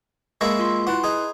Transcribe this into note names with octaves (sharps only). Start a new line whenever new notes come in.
G#3 A#3 E4 C#6 E6 A#6
F4 C6
E4 F#4 B4 C6
D#4 G#4